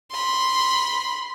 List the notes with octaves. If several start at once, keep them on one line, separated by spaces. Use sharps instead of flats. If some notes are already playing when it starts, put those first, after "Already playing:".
B5 C6